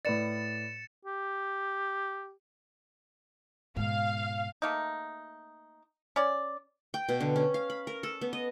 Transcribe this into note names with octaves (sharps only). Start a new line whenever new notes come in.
A2 B4 D5 A6 C#7 E7
G4
G#2 B2 F5
A3 A#3 D#4
C#4 D5
G5
B2
D3
C#4
F5
B5
A#4
A4
B3
D#5